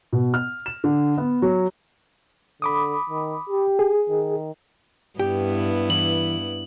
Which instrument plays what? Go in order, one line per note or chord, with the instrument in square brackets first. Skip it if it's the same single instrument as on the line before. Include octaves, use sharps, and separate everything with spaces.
[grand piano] B2
F6
E7
D3
B3
F#3
[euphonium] D3 [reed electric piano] B5 D6 D#6
[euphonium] D#3
G4
[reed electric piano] G#4
[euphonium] D#3
[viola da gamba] G2 B3 E4 [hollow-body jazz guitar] G4
[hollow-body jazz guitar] E3 [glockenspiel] F#7